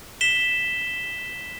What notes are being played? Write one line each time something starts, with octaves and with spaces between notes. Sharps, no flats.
B6 E7 G7